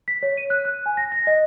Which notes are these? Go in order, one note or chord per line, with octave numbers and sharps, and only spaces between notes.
B6
C#5
D#7
F#6
F#6
G#5
A#6
A#6
D#5